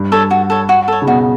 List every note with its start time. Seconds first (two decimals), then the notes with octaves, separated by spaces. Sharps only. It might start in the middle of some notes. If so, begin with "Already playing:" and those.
Already playing: G2
0.12 A4 C#5
0.31 F#4
0.50 A4 C#5
0.69 F#4
0.88 A4 C#5
1.02 C#3
1.07 B2 F#4